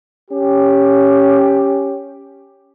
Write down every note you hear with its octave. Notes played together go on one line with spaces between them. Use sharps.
C#4 G4